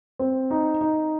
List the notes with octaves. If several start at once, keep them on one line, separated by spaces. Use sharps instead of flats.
C4
D#4
D#4